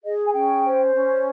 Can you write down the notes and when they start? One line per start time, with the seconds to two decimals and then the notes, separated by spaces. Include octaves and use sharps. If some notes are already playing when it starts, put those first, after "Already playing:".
0.04 G#4 D#5
0.26 G#5
0.34 C#4 G5
0.65 C5
0.95 C#4